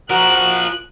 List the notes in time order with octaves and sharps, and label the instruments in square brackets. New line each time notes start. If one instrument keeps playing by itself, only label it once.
[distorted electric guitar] F3 A#4 [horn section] F#4 [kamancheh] F#6